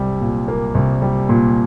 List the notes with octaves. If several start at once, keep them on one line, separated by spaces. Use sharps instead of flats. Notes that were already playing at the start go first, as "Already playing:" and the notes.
Already playing: C2 G3
A#2
A#3
C2
G3
A#2